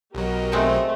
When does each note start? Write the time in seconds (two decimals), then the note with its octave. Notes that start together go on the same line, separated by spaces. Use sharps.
0.15 B1 F#3 G4 A#4 D#5
0.52 G#3 A3 C4 D#4